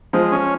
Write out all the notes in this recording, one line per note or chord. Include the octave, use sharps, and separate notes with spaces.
F3 G#3
C#4